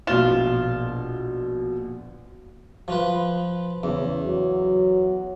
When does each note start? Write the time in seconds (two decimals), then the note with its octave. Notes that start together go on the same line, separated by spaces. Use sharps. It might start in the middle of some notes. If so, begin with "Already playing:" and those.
0.07 A#1 B2 F4 E7
2.88 F3 F4 B4
3.83 E2 C#3
4.24 F#3